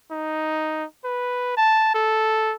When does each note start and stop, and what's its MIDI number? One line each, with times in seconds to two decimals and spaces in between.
0.11 0.85 63
1.04 1.56 71
1.57 1.91 81
1.95 2.55 69